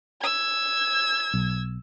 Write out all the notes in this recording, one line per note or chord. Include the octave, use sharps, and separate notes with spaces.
E6 G#6
B1